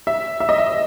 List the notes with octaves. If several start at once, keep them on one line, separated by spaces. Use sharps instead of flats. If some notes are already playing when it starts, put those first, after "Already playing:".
E5
E5
D#5
E5